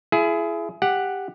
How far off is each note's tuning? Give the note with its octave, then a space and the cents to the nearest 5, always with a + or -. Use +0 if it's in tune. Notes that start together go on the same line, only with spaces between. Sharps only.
E4 +35 G#4 +20
G4 +10 F#5 +0